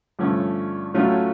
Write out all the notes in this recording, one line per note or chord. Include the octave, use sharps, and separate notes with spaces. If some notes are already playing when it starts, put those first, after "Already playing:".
G2 D3 F3 A3 C#4
A2 F#3 A3 C#4 F4